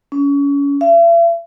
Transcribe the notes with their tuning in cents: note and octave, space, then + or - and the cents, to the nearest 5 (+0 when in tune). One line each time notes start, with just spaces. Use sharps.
C#4 +30
E5 +45